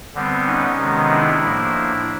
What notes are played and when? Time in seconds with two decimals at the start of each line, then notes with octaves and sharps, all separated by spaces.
0.14 D3 G3 B3 C4
0.46 C#4 D#4
0.78 C3 D#3 G#3 B3
1.10 D4 E4
1.42 A2 F3 A#3